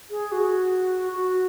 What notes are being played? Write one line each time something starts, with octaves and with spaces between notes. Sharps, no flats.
G#4
F#4
F#4